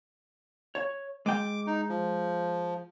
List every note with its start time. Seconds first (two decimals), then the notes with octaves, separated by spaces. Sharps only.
0.75 C#5
1.26 G#3 G5 D6
1.67 D#4
1.89 F3